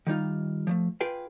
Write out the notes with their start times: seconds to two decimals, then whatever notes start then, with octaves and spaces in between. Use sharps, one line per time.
0.07 D#3 G3 D#4 F4
0.67 F3 F#3 A3
1.01 F4 G#4 B4 G5